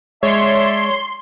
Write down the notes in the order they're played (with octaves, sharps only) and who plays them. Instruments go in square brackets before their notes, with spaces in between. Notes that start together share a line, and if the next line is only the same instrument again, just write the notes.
[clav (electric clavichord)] G#3 [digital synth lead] C#5 [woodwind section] D5 E5 A5 [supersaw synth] C6